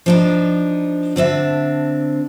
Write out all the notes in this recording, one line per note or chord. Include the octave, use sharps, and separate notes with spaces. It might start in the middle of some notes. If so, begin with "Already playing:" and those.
F3 D4 D#4
D3 C4 D4 E5